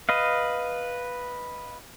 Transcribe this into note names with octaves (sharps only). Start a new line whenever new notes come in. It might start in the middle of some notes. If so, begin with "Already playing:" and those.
B4 D#5 F5